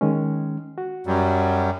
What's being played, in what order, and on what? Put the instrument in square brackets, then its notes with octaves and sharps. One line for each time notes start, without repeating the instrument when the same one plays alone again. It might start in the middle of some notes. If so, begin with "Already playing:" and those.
[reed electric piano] D#3 G#3 C#4
F#4
[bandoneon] F#2 F#3 G3